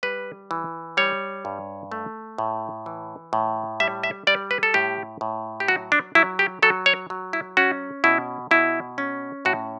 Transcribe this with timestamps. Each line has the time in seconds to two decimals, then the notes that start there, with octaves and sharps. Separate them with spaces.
0.03 G3 B4
0.51 E3
0.97 G3 C#5
1.45 G2
1.92 A3
2.38 A2
2.86 E3
3.33 A2
3.80 G3 E5
4.03 E5
4.27 G3 D5
4.51 B4
4.63 A4
4.74 A2 G4
5.21 A2
5.60 G4
5.68 F#3 F#4
5.92 D4
6.15 F#3 E4
6.39 G4
6.63 F#3 A4
6.86 C#5
7.10 F#3
7.33 E4
7.57 C#4 F#4
8.04 B2 E4
8.51 B2 E4
8.98 C#4
9.45 A2 F#4